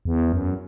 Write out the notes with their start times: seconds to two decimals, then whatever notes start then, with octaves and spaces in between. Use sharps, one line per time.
0.05 E2
0.32 F#2